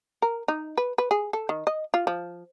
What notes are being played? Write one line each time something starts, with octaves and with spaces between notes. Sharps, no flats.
A#4
D#4
B4
B4
G#4
A4
D#3
D#5
F4
F3